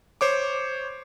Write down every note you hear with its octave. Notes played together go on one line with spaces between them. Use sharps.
C5 C#5 D6